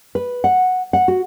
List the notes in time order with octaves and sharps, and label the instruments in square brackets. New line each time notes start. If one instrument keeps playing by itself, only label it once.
[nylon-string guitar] B4
F#5
F#5
F#4